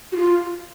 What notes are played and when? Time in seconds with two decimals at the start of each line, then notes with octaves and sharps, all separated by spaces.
0.12 F#4
0.16 F4